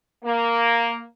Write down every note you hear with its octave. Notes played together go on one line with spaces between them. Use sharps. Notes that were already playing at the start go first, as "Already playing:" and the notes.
A#3